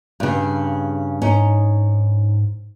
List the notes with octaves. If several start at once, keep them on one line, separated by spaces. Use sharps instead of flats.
G2 C#3
G#2 C#4 D#4